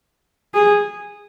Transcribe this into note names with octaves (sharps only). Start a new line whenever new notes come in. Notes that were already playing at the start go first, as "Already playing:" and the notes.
G#4